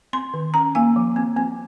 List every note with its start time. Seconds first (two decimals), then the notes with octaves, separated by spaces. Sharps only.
0.13 C4 C6
0.34 D#3
0.54 C#4 A#5
0.75 A#3 G#5
0.96 F3
1.16 C4
1.37 C4